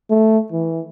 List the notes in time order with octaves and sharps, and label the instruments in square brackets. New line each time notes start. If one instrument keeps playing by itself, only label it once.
[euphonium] A3
E3